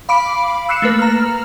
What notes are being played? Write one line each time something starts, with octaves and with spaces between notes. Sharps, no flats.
F5 B5 D6 D7
E6 F#6 C7 C#7 E7
A3 A#3 B4
A#5 F6